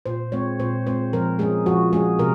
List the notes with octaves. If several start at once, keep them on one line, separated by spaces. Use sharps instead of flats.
A#2 C5
G#3 C4 C#5
A#2 C5
G#3 C4 C5
F3 A#4
G#3 C#4 G#4
F3 F#4
G#3 C#4 G#4
C3 A#4